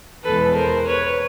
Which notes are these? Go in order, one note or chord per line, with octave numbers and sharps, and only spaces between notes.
E2 B2 G#3 A4 B4
A#4 C5
B4 C#5